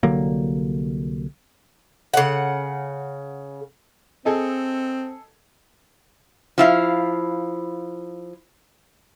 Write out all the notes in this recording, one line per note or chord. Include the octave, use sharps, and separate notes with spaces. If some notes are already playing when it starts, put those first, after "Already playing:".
C2 D3 F#3 A#3
C#3 F#5
C4 G#4 A4 D#5
F3 E4 F5